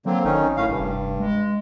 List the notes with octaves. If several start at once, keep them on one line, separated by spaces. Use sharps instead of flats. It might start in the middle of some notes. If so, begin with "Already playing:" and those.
D3 F#3 A#3 C4
G#1 D#3 C#4 D#4
A2 C#4 F5
F1 G2
G#3